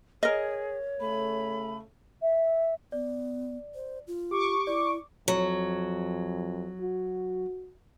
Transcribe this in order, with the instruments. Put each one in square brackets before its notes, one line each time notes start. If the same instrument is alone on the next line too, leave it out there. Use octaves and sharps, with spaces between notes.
[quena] G#4 [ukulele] A#4 D#5 [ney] C#5
[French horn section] C#3 A3 [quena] B5
[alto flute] E5
[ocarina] B3 [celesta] D5
[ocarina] C5
F4
[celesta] G4 [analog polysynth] C#6 D6
[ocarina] E4 [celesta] D5
[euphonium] F2 [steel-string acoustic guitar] F#3
[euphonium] F#4